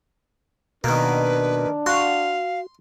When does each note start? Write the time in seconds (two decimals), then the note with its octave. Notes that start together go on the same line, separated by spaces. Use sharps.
0.84 B2 D#3 A#3 D4 B4
1.86 F#4 F5 C6